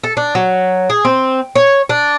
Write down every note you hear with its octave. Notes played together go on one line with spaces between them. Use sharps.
A4
D4
F#3
G#4
C4
C#5
D4